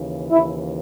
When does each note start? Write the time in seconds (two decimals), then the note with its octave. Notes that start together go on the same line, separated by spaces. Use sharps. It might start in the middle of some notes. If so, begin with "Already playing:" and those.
Already playing: D#2 C#3 E3
0.31 D#2 C#3 E3 E4